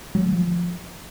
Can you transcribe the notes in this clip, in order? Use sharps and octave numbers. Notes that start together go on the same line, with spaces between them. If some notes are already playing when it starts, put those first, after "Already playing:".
F#3
A3
E3
F3